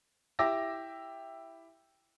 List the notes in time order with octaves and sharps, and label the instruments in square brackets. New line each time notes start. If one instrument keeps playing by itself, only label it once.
[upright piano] E4 G4 E5 D6 E6 A#6